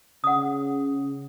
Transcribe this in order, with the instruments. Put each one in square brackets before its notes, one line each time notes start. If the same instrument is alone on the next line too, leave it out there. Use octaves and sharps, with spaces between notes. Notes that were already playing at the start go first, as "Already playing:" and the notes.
[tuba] C#3 [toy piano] F#5 D#6